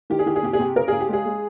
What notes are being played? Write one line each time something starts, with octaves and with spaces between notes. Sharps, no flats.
D#3 G4
G#4
D#3 G4
G#4
C3 G4
G#4
C3 G4
C#3 A#4
C#3 G#4
G4
G#3 G#4
G#3